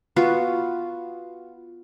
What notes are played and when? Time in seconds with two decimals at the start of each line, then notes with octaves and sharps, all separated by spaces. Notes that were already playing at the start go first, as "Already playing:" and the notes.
0.16 B3 F4 F#4